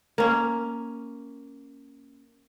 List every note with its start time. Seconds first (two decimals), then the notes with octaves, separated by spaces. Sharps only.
0.18 A#3 C#4